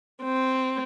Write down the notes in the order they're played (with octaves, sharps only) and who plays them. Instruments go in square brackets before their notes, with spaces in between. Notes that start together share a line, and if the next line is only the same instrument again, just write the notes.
[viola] C4